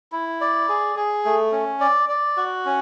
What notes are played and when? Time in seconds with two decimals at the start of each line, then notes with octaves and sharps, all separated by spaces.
0.12 E4
0.41 D5
0.69 G#4
0.96 G#4
1.25 A3
1.52 C#4
1.81 D5
2.09 D5
2.37 F#4
2.66 C#4